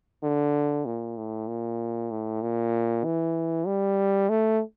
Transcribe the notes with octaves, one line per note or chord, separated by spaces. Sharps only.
D3
A#2
A2
A#2
A2
A#2
E3
G3
A3